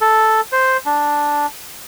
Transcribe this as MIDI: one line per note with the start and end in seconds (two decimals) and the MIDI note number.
0.01 0.41 69
0.52 0.77 72
0.86 1.46 62